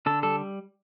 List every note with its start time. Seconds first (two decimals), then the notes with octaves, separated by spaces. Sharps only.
0.06 D3 A4
0.23 G3 A4